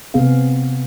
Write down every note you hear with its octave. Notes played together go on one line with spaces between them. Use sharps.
C3 B3 C4 G#4 F5